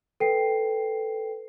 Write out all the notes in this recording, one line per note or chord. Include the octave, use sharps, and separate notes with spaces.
A4 B4 G5 C7